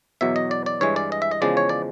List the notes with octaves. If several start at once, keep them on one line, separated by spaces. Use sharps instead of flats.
E2 B2 F#3 E5
D#5
D5
D5
G2 E3 G#3 C#5
D5
D#5
E5
D#5
E2 C#3 F3 G#3 D5
C#5
D5